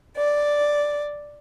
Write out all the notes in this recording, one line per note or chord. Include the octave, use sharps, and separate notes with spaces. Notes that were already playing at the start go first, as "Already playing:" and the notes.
D5